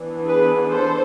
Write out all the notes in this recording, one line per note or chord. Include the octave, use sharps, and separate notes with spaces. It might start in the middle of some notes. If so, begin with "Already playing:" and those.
Already playing: E3 B3 D4
G#4 B4
A4 C5